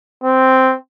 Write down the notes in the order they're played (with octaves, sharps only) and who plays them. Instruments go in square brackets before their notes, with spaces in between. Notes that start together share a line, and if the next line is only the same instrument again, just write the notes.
[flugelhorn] C4